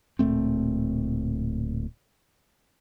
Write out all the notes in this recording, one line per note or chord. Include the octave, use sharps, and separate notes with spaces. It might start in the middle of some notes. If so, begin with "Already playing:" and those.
D1 A#2 A3 C4